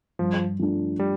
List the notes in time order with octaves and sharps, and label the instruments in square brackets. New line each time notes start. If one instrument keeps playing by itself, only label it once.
[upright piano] G2 [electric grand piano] F3
[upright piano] F3 A3 D4
[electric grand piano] G3